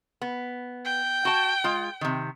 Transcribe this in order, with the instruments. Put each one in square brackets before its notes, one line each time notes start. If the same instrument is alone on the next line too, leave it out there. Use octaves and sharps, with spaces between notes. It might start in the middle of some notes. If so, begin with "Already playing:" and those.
[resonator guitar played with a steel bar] B3
[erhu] G5
[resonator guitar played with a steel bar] F#4 A5
G#3 F4
C3 D#3